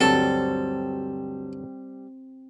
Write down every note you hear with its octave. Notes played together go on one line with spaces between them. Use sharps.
D2 G2 F#3 G3 C4 A4 A5